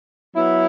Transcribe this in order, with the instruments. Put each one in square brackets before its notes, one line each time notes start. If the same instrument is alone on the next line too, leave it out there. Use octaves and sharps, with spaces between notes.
[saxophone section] F#3 B3 E4